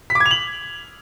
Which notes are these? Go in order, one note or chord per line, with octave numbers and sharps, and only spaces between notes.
B6
D6
G#6
F7
F#7